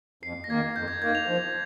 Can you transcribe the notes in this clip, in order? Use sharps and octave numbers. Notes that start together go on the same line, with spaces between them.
F2 C7
A#6
D#3 A#3 G#6
F2 G6
G#6
D#3 A#3 G#6
F7
F3